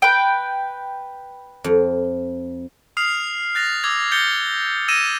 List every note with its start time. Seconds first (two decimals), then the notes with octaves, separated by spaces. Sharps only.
0.02 B4 G5
1.64 F2
2.97 D#6 F6 C7 F7
3.55 F#6 A6 A#6 F7
3.84 D6 E6 G#6 F7
4.12 G6 A6 A#6 C#7 G7
4.88 E6 G#6 A#6 D#7 E7